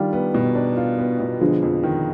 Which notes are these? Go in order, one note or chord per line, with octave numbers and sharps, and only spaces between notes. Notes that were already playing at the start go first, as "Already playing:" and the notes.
Already playing: D#3 G3 D4 F4
B3
B2
D4
F4
B3
B2
D3 F3 G#3
F2
D#3